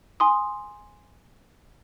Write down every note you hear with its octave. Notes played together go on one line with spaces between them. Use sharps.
G#5 C6 D#6